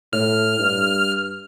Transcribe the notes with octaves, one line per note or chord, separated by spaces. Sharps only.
A2 F6
G2